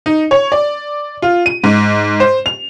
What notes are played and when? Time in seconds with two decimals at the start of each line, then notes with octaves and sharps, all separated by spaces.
0.06 D#4
0.31 C#5
0.52 D5
1.22 F4
1.46 D#7
1.64 G#2
2.20 C5
2.46 F7